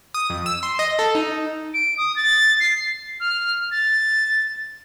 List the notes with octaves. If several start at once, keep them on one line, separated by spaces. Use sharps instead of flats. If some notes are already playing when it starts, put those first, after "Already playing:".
D#6
F2
E6
C6
D#5
A4
D#4
D7
D#6
A6
C7
F6
A6